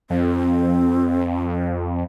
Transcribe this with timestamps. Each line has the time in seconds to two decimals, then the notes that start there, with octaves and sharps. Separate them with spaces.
0.10 F2 C4